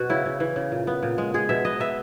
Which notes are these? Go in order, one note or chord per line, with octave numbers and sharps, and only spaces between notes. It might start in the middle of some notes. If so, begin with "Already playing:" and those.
Already playing: B2 F#4
C#3 E4
C#3
E3
C#3
A#2
B3
A#2
G#3
G#3 G#4
B2 E5
B3 D#5
B3 E5